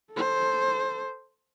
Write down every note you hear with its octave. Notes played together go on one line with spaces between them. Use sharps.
A4 C5